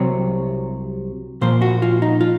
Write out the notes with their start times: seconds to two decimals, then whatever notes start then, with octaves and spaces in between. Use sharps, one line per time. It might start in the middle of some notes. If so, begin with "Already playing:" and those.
Already playing: C2 C3 F#3 C4 C#5
1.41 A#2 F3 A#3 C5
1.62 F#4
1.82 F4
2.02 D#4
2.21 F4